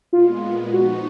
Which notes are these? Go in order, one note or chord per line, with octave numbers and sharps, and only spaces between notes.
A#2 G#3 B3 F4
F3 B3 D#4 F#4